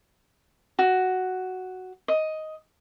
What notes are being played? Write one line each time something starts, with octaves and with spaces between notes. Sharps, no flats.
F#4
D#5